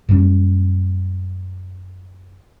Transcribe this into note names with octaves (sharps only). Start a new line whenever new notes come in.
F#2 A#2 G3 C#4